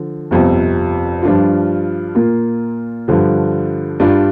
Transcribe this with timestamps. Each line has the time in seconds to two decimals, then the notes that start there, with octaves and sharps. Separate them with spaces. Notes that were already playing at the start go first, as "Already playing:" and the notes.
Already playing: D3 F3
0.31 G1 F2 C3
1.23 G2 F3 D4 F4
2.15 A#2 A#3 F4
3.08 G2 D3 F3
4.00 G2 G3 D4 F4